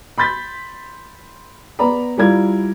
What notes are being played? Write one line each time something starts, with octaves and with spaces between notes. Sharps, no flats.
B5 C6 G6 A6 B6
B3 D5 A#5 B5
G3 E4 F4 A#4 D5 G#6